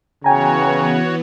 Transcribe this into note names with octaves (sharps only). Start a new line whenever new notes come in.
C#3 E3 B3 F#4 C#5 G5 G#5 A#5